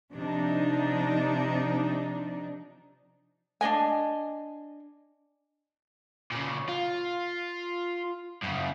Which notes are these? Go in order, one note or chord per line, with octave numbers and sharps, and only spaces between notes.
C3 F3 D4 D#4
D4 D#4 D#5 G#5
A#2 C#3
F4
F#2 C#3